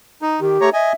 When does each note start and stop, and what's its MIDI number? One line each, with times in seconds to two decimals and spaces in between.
0.22 0.40 63
0.41 0.58 51
0.41 0.70 67
0.61 0.70 57
0.61 0.70 73
0.61 0.70 82
0.73 0.93 75
0.73 0.93 76
0.73 0.93 80